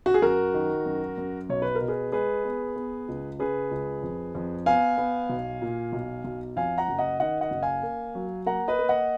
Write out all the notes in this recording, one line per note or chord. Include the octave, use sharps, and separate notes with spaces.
F#4
G#4
F#2 F#4 A#4
D#3
F#2
F#2
B1 C#5
B4
A#4
B2
G#4 B4
G#3 G#4 B4
B3
B3
C#2
C#3 G#4 B4
C#2
F2
F2
B3 F5 G#5
B3
B1
A#2
B1
B1
F2 F5 G#5
F#5 A#5
F#1
D#5 F#5
D#3 D#5 F#5
D#5 F#5
F#1
F5 G#5
A#3
F#3
A#3 F#5 A#5
B4 D#5
A#3
D#5 F#5